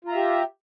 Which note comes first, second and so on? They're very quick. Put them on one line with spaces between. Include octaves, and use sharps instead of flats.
F4 A#5 E5 G4